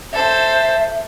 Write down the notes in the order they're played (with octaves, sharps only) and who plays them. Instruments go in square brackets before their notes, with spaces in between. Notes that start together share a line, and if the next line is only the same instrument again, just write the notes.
[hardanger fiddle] A4 C5 [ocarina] E5